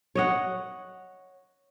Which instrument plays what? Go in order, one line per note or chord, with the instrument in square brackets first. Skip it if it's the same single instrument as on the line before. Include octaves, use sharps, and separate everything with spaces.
[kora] C#5 D#5 F#5